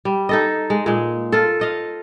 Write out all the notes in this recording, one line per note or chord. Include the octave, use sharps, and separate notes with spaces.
G3
D#4 A4 D#5
G#3
A#2 G#3
F4 A4
C5 D#5 F5